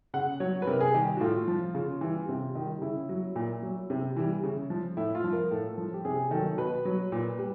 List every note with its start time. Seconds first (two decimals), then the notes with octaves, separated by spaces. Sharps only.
0.14 C#3 F#5
0.40 F#3 C#5
0.62 B4
0.67 C3 A#4
0.81 G#4
0.94 D#3 G3 G4
1.17 F#4
1.21 A2 F4
1.48 F3
1.75 C#3 F4
2.01 E3 G3
2.29 C3
2.55 D#3 G3
2.82 C#3 E4
3.09 F#3
3.36 A#2
3.63 F#3
3.90 C3
4.16 E3 G3
4.43 C#3
4.70 F3
4.97 A2 E4
5.15 F4
5.24 F3
5.33 A#4
5.51 A2 A4
5.78 F3
5.94 G4
6.05 C3 G#4
6.31 D#3 F#3 A4
6.58 B2 B4
6.85 F#3
7.12 A#2
7.39 G3